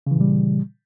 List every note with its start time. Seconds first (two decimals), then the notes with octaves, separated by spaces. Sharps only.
0.07 C#3
0.11 E3
0.16 A#2
0.20 G3